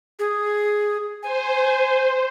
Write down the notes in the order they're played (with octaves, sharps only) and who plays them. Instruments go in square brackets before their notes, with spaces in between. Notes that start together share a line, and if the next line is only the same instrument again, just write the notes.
[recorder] G#4
[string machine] C5 [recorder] G#5